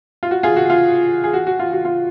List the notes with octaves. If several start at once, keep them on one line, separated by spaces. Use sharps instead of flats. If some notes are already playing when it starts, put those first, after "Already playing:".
F4
F#4
F4 G#4
F#4
F4
G#4
F#4
F#4
F4
F#4
F4